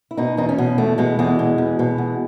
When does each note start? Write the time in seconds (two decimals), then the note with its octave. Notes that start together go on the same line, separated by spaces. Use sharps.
0.11 E4
0.17 B2 D#4
0.37 E2 D#4
0.49 C#4
0.58 B2
0.78 E2 A3
0.98 B2 G#3
1.19 E2 G#3
1.39 B2
1.58 E2
1.79 B2
1.98 E2